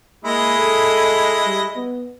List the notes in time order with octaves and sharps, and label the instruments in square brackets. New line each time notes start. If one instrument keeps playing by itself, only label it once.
[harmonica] G#3 E4 D#5 [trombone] A#3
[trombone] A4
G3
B3